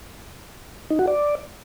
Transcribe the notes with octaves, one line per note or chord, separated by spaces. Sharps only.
D#4
F#4
D5